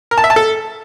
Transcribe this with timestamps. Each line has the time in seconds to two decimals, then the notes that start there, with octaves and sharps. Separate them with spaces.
0.11 A#4
0.18 A5
0.24 E5
0.30 A5
0.36 A4